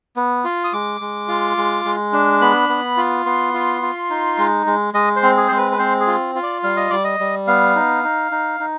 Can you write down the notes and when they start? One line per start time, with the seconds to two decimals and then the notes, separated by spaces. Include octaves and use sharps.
0.16 B3
0.44 F4
0.64 D#6
0.73 G#3 D6
1.01 G#3
1.28 F4
1.57 G#3
1.85 G#3
2.13 D4
2.41 B3 B5
2.69 B3
2.97 F4
3.26 B3 C6
3.54 F4
3.82 F4
4.10 D#4
4.38 G#3
4.66 G#3
4.94 G#3 D#5
5.16 C5
5.23 C4
5.37 G#4
5.48 G#3 C5
5.57 B4
5.72 B4
5.79 C4 C5
6.00 G#4
6.07 F4
6.35 F4
6.43 D5
6.63 G3 F5
6.77 D#5
6.90 G3 D5
7.04 D#5
7.20 G3
7.47 B3 F5
7.76 D#4
8.04 D#4
8.32 D#4
8.60 D#4